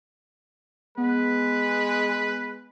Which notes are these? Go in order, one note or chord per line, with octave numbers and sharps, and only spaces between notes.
G#3 B3 B4